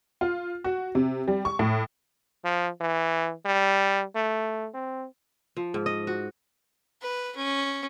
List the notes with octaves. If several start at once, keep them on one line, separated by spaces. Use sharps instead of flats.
F4
F#4
C3
G3
C#6
A2
F3
E3
G3
A3
C4
F3
G#2
D#5
F#4
B4
C#4